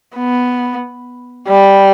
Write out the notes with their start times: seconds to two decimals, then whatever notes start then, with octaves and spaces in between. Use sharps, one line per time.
0.16 B3
1.48 G3